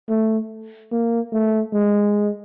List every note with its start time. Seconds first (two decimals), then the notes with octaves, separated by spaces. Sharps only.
0.09 A3
0.92 A#3
1.32 A3
1.73 G#3